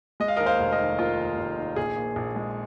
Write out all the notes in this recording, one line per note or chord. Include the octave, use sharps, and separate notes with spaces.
G#3 D#5
F5
D#2 A#4 D#5
C5 F5
F1
A#4 D#5
D#3
G#3 F4 A#4
D#2
F1
D#3
A#1 G#4
A#2
A#1
G#3